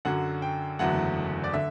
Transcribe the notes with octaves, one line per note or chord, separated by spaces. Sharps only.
F#2 D3 F#3 F#5
G5
F#1 E2 D3 F#3 A3 F#5
D5
D3 E5